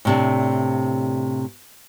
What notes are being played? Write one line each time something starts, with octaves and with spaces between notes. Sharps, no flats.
A2 C3 D4